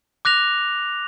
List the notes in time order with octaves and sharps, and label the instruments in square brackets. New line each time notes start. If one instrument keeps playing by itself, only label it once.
[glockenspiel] D6 F#6 A#6 F7